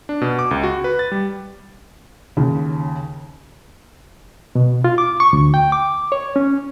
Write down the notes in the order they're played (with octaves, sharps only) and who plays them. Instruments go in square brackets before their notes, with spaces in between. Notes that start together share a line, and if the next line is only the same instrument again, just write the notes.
[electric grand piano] D4
B2
D6
C#2
F#4
B4
A6
G3
[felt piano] D#2 C#3
[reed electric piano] B2
F4
D6
C#6
D2
G5
D6
C#5
C#4